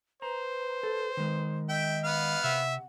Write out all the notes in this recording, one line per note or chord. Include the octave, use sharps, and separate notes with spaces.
B4 C5 A#5
A4
D#3 G#3
D#5 E5 G5
B3 F5
C3 E5 F#5